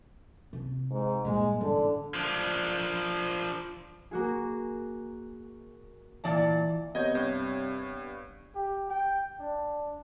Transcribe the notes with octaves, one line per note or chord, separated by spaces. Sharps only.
C3
G#2
G2 A#2 G#3
A1 D3
F3 D4
A#3 F#4 G#4
A#2 E3 D5 A5
C3 B3 C#5 D#5 G6 G#6
G2
G4
G5
D4